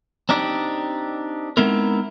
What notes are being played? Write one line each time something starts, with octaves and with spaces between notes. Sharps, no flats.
C4 D4 D#4 G4
G#3 B3 C4 D#4 E4 A#4